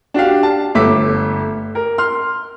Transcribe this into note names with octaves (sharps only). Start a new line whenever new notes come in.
D4 F#4 G4 F5
A5
G1 A3 D6 E6 B6
A#4
C6 F6